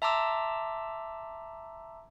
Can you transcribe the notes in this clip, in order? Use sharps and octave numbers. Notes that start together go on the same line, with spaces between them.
E5 A5 A#5 C6 D6 E6